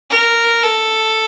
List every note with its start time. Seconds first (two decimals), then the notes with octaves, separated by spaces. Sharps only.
0.10 A#4
0.63 A4